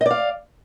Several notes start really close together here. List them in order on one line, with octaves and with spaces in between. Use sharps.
D#5 D5 F5